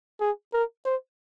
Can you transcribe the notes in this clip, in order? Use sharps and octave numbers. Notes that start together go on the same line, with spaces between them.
G#4
A#4
C5